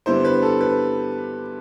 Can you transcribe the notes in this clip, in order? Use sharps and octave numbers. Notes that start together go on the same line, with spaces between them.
G2 D3 G3 B3 E4 C5
B4
A4
B4